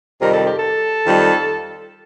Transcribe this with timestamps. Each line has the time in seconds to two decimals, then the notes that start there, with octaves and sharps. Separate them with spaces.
0.21 F2 C3 D#3 G3 A#4
0.33 A4
0.45 G4
0.58 A4
1.05 F2 D#3 G3